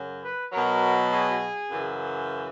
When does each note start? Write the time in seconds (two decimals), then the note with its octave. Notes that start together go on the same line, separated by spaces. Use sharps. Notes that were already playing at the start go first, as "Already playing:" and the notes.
Already playing: F#2 C#3 F#3
0.23 B4
0.53 B2 F#3 A#4
1.12 G#4
1.71 F#2 C#3 E3